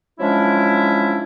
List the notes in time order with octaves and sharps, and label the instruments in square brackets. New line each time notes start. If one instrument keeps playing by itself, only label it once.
[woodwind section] F3 F#3 G#3 C#4 D4 E4